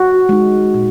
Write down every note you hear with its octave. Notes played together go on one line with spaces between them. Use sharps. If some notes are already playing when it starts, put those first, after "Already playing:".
Already playing: F#4
G#3 D#4
A#2